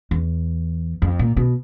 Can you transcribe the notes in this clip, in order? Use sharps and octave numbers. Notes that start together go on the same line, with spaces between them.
E2
F2
A#2
B2